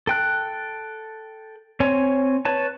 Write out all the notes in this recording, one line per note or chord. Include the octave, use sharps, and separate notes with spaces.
A4 G5 F#6
C4 C#5 G#5
B4 C#5 A5